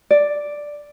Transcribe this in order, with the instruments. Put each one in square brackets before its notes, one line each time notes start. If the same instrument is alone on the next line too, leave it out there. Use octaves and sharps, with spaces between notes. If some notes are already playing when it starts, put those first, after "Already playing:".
[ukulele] D5